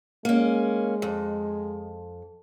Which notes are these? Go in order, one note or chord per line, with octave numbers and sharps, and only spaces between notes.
G#3 A#3 C#4
F2